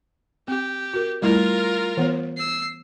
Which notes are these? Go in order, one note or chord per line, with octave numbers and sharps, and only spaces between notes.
C4 G4
F#4 A#4
G3 A3 E4 F4 A#4
E3 B3 C#5
E6 C7